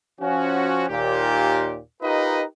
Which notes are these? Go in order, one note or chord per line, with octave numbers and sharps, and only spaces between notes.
F3 C#4 F#4
D#2 A#2 G4
D#4 F4 G4 A#4 B4 D#5